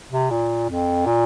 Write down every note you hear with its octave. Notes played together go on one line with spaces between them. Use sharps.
C3
A#2
F2
A#2